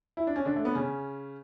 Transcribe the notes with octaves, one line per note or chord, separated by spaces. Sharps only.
E4
D4
C#4
D3 D4
A3
B3
C#3 C#4